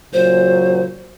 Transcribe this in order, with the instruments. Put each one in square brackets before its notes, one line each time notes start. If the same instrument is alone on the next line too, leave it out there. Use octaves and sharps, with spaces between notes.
[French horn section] A#2 C#3 F#3 [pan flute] C5